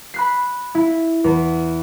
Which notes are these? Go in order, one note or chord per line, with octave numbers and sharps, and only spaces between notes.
B5 F#6 C7
E4
E2